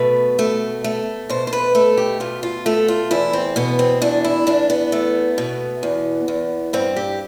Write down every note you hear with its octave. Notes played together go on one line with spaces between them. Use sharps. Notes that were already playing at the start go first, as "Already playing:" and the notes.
Already playing: B2 A3 B4
A3
A3
B2 C5
C5
B4
A3 A4
G4
B2 F4
F4
A3 A4
F4
E2 E4
C4
B2 B3
C4
E2 D4
E4
E2 D4
B3
A3
B2
E2
E2
G2 C4
G4